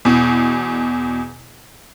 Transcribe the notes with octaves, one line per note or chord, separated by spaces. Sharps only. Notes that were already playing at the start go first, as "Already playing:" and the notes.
E2 B2